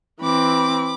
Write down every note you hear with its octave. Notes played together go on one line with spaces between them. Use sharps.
E3 C4 B5 D6